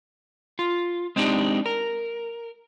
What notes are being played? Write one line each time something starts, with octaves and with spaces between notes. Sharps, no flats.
F4
G#3 C4 D4 D#4 G4
A#4